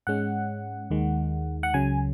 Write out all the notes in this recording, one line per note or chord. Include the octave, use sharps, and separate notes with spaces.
G#2 G#3 C#4 F#5
D#2 D#3 G#3
F#5
C#2 C#3 F#3 G#5